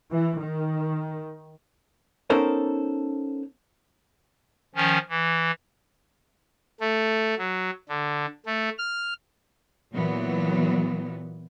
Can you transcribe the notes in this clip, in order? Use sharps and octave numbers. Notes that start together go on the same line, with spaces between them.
E3
D#3
B3 C#4 D#4 A4 A#4 C5
D#3 F3 C#4
E3
A3
F#3
D3
A3
F6
A#2 E3 F#3 B3